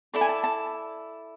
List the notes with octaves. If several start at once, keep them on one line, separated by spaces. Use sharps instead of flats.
E4 A4 D5 A5
G#5
A5
A5